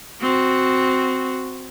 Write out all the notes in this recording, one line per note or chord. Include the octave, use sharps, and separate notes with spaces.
C4 F#4